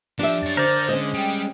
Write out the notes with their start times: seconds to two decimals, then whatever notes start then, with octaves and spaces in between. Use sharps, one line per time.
0.19 F3 D4 G4 E5
0.43 F#2 C#5 A6
0.57 D3 A#4 C5 D5
0.89 G#3 C#4 D#5
1.14 G3 G5